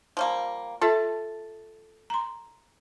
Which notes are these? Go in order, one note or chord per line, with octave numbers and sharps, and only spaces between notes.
F3 G3 A#3
F4 A4 E5 A5
A#5 C6